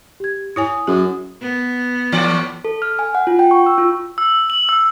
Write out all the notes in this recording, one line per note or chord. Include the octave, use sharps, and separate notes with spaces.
G4 G#6
E4 C#5 G#5 D#6
F#2 G#4
B3
A2 E3 D5
A4
F6
G#5
F#5
F4
G5
C#6
E6
F4
E6
F#7
E6